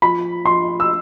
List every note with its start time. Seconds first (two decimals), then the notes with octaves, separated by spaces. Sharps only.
0.02 F3 B5
0.45 F3 C6
0.80 E6